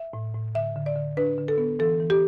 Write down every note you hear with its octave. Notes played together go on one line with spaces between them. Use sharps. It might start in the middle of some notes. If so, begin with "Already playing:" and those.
Already playing: E5
A2
A2
D3 E5
D3
D5
D3
D4 B4
D3
A4
B3
E3 A4
E3
G4